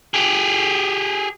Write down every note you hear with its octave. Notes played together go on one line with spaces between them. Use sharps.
G4 G#4